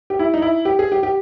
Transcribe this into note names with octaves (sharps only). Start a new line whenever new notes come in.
G4
E4
D#4
E4
G4
G#4
G4
G4